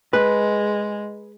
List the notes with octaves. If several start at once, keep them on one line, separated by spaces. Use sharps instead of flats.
G#3 B4